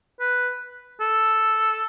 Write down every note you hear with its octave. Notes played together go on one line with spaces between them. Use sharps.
B4
A4